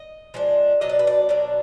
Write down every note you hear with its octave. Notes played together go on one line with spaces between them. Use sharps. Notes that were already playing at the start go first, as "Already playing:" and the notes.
Already playing: D#5
F3 G#3 D4
B2 F#3 D4 D#5
D5
B4
D5
B2 F#3 D4